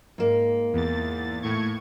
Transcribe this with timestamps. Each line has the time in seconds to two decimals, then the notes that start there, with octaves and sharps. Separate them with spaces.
0.18 G#2 A#3
0.73 E2 A6
1.42 A2 C#6 G#6